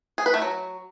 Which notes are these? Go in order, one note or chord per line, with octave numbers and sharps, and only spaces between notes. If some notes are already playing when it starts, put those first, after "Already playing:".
G#4
B4
A3
F#3